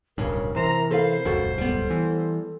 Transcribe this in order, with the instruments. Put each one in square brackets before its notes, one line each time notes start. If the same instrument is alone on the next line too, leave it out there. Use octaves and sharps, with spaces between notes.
[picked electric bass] D1 B1 G2 [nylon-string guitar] C#3 [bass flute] A#4
[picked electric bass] C3 E3 [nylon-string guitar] C5 [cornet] A#5
[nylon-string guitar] A4 B4 F5 [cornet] C5
[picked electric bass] D#1 C#2 F#2 [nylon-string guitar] F#4 A4
[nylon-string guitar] G3 B3 [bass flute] A4
[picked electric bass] E3